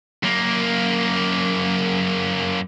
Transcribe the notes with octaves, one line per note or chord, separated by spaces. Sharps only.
F#2 A#3